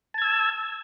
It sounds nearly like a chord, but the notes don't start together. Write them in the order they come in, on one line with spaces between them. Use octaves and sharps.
A5 G#6 E6